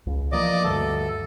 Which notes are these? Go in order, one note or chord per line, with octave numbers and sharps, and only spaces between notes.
C#2
E3 F3 A#3 D5 D#5 D6
D2 G2 A4